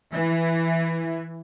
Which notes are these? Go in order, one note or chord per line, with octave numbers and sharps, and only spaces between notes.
E3